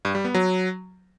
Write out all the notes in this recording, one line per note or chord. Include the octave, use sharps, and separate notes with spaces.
G2
G3
B3
F#3